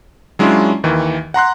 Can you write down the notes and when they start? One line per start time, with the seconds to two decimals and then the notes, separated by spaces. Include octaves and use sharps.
0.39 F#3 G#3 C#4 D4 E4 F4
0.84 D#2 D#3 E3
1.34 F#5 A#5 C6 F#6